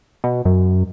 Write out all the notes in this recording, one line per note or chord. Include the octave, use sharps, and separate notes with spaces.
B2
F#2